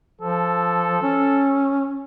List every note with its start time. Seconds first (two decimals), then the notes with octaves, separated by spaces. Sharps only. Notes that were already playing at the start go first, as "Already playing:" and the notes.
0.21 F3 A4
1.03 C#4